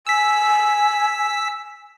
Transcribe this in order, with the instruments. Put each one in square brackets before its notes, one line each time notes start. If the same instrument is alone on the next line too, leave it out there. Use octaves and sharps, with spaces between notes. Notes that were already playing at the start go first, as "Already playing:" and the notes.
[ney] G#5 [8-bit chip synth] E6 B6